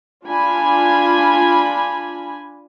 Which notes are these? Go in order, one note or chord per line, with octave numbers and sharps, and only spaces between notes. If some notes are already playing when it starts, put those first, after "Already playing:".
D4 F4 G#5 B5